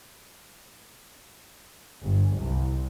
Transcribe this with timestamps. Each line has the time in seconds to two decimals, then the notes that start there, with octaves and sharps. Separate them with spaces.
2.02 G1
2.37 C2